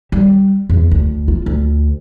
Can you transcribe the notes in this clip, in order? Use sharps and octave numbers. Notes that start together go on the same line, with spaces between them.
G3
E2
D2
F4
D2